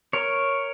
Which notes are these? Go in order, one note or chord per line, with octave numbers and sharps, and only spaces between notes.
A#4 C#5